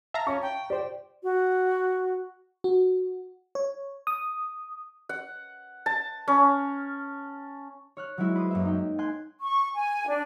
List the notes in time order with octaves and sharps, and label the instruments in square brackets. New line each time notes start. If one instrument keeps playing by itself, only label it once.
[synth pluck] E5 F5 A#5 [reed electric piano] A5
[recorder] C#4 [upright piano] C#6
[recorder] G5
[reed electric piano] G4 C5 [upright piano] D5
[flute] F#4
[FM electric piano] F#4
C#5
D#6
[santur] F#5
A5
C#4
[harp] C#5 F6 F#6
F#3 G#3 E4 F#4
B4 C5 D#6
F#2 A#3 E5
D#4 G5
G5 G#5 C6 F#6 G6
[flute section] C#6
G#5
D4